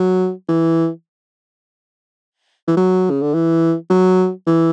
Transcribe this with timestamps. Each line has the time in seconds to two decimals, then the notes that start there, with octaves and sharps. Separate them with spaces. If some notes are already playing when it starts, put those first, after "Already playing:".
Already playing: F#3
0.49 E3
2.68 E3
2.77 F#3
3.10 C#3
3.21 D3
3.34 E3
3.90 F#3
4.47 E3